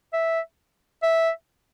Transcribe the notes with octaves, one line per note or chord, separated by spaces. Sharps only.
E5
E5